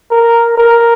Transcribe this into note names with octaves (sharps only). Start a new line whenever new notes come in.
A#4
A#4